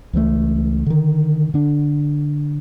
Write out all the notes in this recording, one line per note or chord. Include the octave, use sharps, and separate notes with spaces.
C#2 E3 F3 A3
D3 D#3
D3 D4